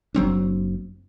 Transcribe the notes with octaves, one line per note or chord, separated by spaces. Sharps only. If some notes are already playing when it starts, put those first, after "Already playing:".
F#1 F#3 C4 D4